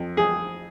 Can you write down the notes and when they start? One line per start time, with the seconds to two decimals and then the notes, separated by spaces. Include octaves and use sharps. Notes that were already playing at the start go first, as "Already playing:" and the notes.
Already playing: F2
0.17 G#4